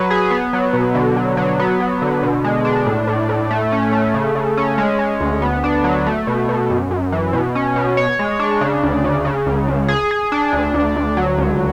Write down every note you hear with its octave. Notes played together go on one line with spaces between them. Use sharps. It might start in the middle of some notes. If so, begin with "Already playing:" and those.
Already playing: F#3 B4
G#4
B3
F#3
B2
D3
F#3
F#3
B3
F#3
D3
B2
G#3
D4
A2
A2
A2
A3
C#4
A3
C#3
C#3
C#4
G#3
G#3
D2
B3
D4
F#3
A3
B2
B2
F#2
F#2
E3
B2
C#4
B2
C#5
G#3
D4
C#3
D2
C#3
C#3
C#2
C#2
G#4
G#4
D4
D2
D2
D2
F#3
C#2